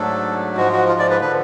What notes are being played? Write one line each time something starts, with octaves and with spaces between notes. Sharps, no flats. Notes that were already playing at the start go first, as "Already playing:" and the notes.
Already playing: G#2 F#3 A3 D4 A4
G#2 F3 G#3 F#4
F#4
F4
D5
B4
D3 F3 B4